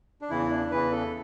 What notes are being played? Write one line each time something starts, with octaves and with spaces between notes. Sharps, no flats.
D4
E2 C#3 E3 E4
D4
E2 C#3 E3 B4
A4